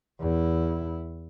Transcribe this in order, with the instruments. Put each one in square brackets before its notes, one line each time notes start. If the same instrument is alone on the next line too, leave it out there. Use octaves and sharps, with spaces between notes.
[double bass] E2 E4